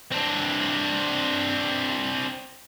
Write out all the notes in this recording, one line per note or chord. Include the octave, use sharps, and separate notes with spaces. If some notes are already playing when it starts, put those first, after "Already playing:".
C4 D4